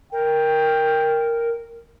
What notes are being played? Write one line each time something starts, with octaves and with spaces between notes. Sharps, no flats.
A#4 G5